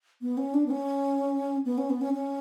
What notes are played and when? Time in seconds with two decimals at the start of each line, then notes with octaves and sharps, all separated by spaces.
0.21 B3
0.37 C#4
0.54 D4
0.66 B3
0.71 C#4
1.65 B3
1.78 C#4
1.90 B3
2.01 C#4
2.14 C#4